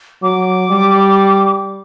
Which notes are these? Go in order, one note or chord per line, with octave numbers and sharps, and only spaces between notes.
F#3 D6
G3